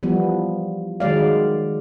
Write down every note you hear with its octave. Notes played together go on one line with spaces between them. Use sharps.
E3 F3 G3 B3
D#3 F#3 G#3 D5 F5